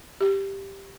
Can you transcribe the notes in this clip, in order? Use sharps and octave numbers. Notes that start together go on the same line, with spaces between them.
G4